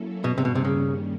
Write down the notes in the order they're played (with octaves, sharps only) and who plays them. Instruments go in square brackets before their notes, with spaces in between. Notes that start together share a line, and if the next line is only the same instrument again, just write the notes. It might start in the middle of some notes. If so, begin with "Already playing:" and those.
Already playing: [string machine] F#3 A#3 C#4 E4 A4
[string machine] G2 D#3 G3 A#3 C#4 [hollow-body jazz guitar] B2
[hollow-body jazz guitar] C3
B2
C3
C#3